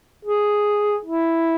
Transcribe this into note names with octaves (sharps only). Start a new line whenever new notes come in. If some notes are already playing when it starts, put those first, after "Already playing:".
G#4
E4